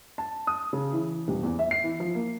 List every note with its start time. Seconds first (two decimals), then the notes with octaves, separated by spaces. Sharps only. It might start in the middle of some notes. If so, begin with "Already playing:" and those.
0.18 A5
0.47 D#6
0.73 C#3
0.93 E3
1.28 D#1
1.43 E2
1.59 E5
1.71 C7
1.84 E3
2.00 F3
2.15 A#3